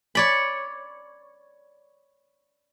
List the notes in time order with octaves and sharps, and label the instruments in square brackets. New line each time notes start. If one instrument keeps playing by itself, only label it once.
[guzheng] C#5 D5 B5